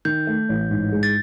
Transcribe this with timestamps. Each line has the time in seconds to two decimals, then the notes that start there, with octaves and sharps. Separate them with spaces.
0.05 D#3 G6
0.27 A3
0.49 A1
0.71 G#2
0.92 G#3
1.03 A6